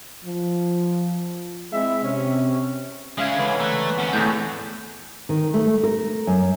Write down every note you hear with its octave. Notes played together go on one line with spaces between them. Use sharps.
F3
G#3 C4 E4 E5
C3 C#4
C#3 G#3 C#4 E5 F5 G#6
C#2 D3 E3 C#5 B5 G#6
A3 A#5 F#6
F2 C#4 F#5
E2 A2 A3 G6
D#3
A3
A#4
F#2